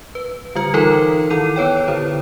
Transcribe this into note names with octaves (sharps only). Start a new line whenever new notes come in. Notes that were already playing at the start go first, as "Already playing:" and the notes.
B4
D3 G3 F4 F6
E3 D#4 A4 A#4 A#5
D#3 E4 A4 D#7
B3 B4 C#5 G5
D3 E4 C5